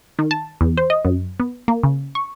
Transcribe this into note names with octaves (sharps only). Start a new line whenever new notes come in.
D#3
A5
E2
C5
D#5
F#2
B3
A#3
C#3
C#6